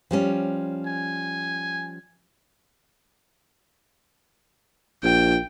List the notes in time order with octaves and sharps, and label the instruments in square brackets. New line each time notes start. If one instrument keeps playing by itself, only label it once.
[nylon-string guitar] F3 G3 C#4
[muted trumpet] G#5
[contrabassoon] A#1 [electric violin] G5